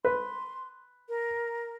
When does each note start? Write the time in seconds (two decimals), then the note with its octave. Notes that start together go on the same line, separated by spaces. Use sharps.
0.05 B4 C6
1.09 A#4